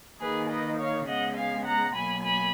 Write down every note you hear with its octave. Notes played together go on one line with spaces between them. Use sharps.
D#3 A#3 G#4 B4
B4 D#5
C#5 F5
C#3 G#3 B3 D#5 F#5
F5 G#5
F#5 A#5
B2 F#3 A#3 G#5 B5
G#5 B5